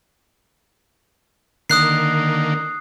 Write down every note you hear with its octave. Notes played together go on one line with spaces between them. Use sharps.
D3 D#3 A#3 D#6 F#6 C7